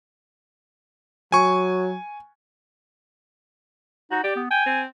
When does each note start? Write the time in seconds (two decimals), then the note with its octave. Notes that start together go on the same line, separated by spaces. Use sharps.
1.32 F#3 G#5 C#6
4.11 D#4 F#4
4.24 G4 D5
4.36 B3
4.51 G5 G#5
4.66 C4